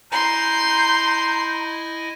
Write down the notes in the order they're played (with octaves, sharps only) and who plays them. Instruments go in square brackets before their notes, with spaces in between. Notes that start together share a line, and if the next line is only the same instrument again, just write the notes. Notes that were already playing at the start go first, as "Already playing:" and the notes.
[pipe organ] E4 D#5 G#5 [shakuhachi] A#5 [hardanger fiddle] C6 [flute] G6